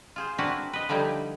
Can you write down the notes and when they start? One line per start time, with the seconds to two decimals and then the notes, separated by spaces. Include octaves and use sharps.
0.16 F4 G#4 C5
0.38 C4 D4 E4 F#4 A#4 B4
0.73 B4 D#5
0.89 D3 F3 G3 D#4 E4 G4